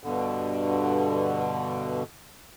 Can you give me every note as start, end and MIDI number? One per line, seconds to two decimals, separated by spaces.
0.04 2.03 43
0.04 2.03 47
0.04 2.03 50